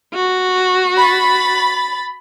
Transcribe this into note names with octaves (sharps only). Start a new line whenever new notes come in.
F#4
B5 A6